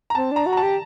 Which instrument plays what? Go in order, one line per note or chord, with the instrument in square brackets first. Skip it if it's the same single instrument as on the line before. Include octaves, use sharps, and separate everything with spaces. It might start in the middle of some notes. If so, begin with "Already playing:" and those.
[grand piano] A#5
[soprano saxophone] C4 [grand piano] A5
[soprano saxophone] D4 [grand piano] A#5
[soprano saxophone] F#4
[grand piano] A#5
A5
[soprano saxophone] G4